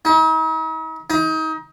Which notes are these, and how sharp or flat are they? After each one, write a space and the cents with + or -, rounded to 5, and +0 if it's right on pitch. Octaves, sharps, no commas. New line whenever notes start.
D#4 +45
D#4 +30